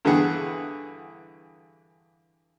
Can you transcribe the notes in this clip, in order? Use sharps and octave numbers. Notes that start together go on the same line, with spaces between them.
G2 D3 E3 G#4 F#5